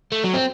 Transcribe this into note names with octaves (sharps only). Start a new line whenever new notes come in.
A3
F#3
C4